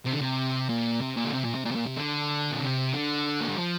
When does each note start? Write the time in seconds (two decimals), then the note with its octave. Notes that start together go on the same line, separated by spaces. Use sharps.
0.05 C3
0.12 D3
0.20 C3
0.69 A#2
1.01 C3
1.17 A#2
1.25 D3
1.33 C3
1.44 A#2
1.55 C3
1.65 A#2
1.71 C3
1.75 A#2
1.86 C3
1.97 D3
2.52 A#2
2.60 C3
2.93 D3
3.41 A#3
3.49 G3
3.57 F3